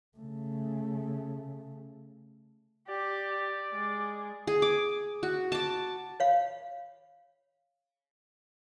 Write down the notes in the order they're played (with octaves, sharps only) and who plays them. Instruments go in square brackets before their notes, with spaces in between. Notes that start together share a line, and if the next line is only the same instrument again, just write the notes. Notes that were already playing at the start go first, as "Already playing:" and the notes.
[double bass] C#3 A3
[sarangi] G4 [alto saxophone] D5
[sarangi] G#3
[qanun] G#4
D6
F#4
A5 D6
[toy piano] C#5 F5 B5